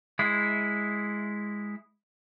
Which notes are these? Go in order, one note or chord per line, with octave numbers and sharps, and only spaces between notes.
G#3 E4